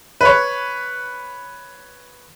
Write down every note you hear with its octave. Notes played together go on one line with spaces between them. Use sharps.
B4 C#5